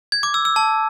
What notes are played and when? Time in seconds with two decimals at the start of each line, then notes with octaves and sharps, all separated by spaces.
0.12 G#6
0.23 D6
0.34 E6
0.45 E6
0.56 A5